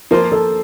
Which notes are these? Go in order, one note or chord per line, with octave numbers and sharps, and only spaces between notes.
F3 A#3 F4 A#4 C5
A4